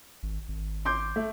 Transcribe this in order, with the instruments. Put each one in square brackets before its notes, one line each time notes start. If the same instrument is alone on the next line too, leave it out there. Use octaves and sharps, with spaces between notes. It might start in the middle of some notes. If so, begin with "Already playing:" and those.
[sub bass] G#1
G#1
[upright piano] C6 D6 G6
A3